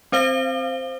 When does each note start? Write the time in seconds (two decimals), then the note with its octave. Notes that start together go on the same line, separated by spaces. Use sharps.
0.12 C4 C5 F5 G7